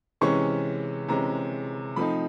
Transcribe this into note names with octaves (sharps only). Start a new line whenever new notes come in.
C3 E3 G#3 C#4 C#6
C3 E3 G#3 C#4 A#5
F3 A3 C4 D#4 B5